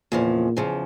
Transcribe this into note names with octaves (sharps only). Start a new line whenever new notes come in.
E2 A#2 C#3 F3
E2 C#3 F3